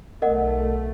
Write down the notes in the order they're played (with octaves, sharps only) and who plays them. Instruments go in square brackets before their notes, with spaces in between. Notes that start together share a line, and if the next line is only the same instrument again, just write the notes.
[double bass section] B1 A3 [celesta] A#4 D#5 F#5